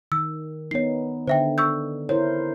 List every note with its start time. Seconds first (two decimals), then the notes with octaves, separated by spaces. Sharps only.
0.12 D#3 E6
0.71 B3 D#4 C#5 C7
1.28 D3 C5 E5 G5
1.58 C#6 E6 G6
2.09 E4 A#4 C5 C#5